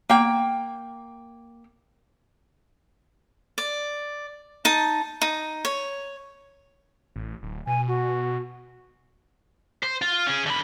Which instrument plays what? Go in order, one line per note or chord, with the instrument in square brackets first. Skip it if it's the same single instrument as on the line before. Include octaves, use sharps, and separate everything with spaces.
[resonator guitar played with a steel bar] A#3 G5
[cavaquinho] D5
D#4 A5
D#4
C#5
[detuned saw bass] A1
D1
[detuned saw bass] B2 [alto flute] G#5
[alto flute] F#4
[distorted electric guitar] C5
F4
C#4 G#4
D3 B5